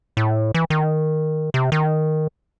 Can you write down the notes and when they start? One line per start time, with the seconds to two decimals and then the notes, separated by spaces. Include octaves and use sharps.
0.17 A2
0.54 E3
0.70 D#3
1.54 C3
1.72 D#3